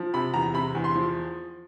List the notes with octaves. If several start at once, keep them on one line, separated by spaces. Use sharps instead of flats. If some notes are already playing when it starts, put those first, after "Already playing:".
Already playing: F3
C3 B5
E2 A#5
C3 B5
E2
C6
F3